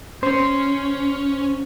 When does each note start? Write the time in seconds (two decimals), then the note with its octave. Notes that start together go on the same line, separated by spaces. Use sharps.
0.23 C#4 C5